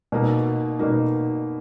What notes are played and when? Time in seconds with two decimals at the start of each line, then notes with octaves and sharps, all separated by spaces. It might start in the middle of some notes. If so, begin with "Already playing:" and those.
0.12 B2 A#3 D#4
0.79 B2 A#3 D#4